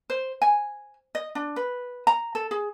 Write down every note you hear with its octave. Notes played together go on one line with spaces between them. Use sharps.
C5
G#5
D#5
D4
B4
A#5
A4
G#4